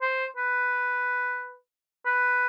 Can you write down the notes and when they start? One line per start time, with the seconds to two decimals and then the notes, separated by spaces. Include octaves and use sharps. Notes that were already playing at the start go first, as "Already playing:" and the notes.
0.02 C5
0.36 B4
2.06 B4